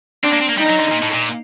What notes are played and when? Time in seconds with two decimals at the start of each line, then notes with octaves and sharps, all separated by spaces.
0.24 C4 D4
0.33 A#3
0.41 C4
0.49 A#3
0.58 G3 D#4
0.70 F#3
0.80 D3
0.92 A#2
1.03 A2
1.14 A#2